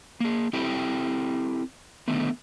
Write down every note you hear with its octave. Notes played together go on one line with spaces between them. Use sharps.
A#3 G#4
C4 E4 G4 A4 G5
D3 D#3 A3 B3